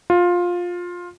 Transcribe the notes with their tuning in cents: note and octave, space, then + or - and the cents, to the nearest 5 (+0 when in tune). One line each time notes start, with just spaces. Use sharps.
F4 +15